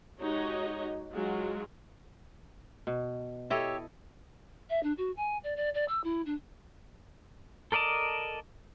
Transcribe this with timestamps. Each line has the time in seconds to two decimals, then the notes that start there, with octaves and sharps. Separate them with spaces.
0.21 G#3 D#4 F#4 G4 C#5 D#5
1.12 F#3 G#3 D#4 F4 F#4
2.87 B2
3.50 E4 G4 A4 C#5 D#5 E5
4.70 E5
4.83 D4
4.98 F#4
5.17 G#5
5.44 D5
5.56 D5
5.74 D5
5.88 E6
6.04 E4
6.26 D4
7.72 A4 A#4 D5 D#5 A5